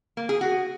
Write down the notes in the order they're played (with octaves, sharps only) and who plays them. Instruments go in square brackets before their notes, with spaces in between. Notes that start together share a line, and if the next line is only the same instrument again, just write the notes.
[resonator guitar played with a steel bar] A#3
G#4
F#4